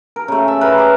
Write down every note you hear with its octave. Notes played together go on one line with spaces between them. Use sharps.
A#4
C#3 A3
E5
A#4 B4 B5
G#4 D6